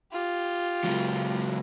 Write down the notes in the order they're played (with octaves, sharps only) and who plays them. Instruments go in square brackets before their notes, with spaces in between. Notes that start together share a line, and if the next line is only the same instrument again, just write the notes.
[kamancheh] F4 G4
[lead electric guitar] C#2 F#3